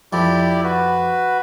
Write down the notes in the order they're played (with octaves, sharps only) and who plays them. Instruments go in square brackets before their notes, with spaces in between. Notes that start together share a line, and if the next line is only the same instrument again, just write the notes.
[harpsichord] F2 F3 [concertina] E4 G4 D5
[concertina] F#4 B4